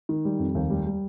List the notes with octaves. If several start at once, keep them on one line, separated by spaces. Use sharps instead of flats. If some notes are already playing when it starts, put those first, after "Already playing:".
D#3
G3
F2
D#2
G3
G3